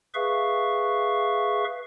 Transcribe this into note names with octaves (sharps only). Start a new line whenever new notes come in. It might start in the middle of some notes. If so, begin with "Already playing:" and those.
G#4 B4 E5 F5 C#6